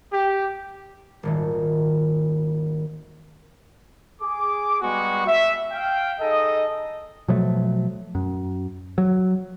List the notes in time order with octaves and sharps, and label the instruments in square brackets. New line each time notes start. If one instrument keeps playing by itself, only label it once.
[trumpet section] G4
[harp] D#1 G#1 D#3
[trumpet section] G#4 D6
G3 G#3 B3 F#4 G#4 C#6
E5
F5 G5
D#4 G#4 A4 D#5
[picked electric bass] B2 F3 F#3 A3
F#2
F#3